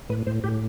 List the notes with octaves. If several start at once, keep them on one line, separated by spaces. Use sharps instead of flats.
A2 B4
A2 C5
A2 G4